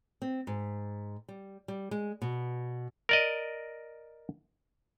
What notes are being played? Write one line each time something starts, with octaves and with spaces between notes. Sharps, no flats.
C4
G#2
G3
G3
G#3
B2
A#4 D5 D#5